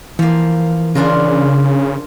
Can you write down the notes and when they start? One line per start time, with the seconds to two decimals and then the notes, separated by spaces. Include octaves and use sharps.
0.19 E3 F3 A#3
0.95 C#3 D4 F4 A#4